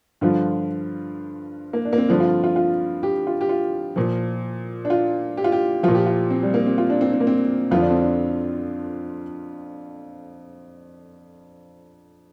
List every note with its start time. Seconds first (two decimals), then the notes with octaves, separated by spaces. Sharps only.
0.21 G2 D3 F3 F4
1.73 A#3
1.85 D4
1.93 A#3
1.98 C4
2.09 G2 D3 F3 D4
2.20 F4
2.44 F4
2.56 F4
3.03 G4
3.27 F4
3.41 G4
3.49 F4
3.96 A#2 F3
4.85 D4
4.90 F4
5.37 G4
5.44 F4
5.52 G4
5.83 A#2 F3 F4
5.95 G4
6.07 F4
6.31 C4
6.43 G3
6.54 A#3
6.66 C4
6.78 F4
6.90 D4
7.01 C4
7.13 C4
7.20 A#3
7.27 C4
7.71 F2 D3 F3 F4
7.81 D4
7.91 C4
8.02 D4